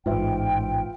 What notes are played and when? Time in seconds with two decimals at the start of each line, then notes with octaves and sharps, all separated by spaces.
0.06 A1 G#2 F4 B4 E5 G5